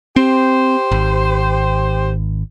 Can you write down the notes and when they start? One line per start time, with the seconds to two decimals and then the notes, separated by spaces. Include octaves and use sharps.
0.16 C4 G4 C5
0.91 G#1